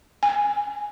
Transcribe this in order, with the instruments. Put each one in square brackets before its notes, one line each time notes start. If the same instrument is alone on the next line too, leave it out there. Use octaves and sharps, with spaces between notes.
[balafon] G#5